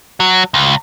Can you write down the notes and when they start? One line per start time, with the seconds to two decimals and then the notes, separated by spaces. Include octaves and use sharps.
0.20 F#3
0.54 C#2